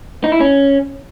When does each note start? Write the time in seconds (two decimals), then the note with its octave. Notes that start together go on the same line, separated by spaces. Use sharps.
0.24 D#4
0.32 E4
0.40 C#4